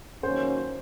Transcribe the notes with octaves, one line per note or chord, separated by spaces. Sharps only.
D#3 F#3 A#3 C#4 C5